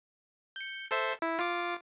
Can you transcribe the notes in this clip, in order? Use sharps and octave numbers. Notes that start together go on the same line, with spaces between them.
G6 C#7
A4 C5 E5
E4
F4 D6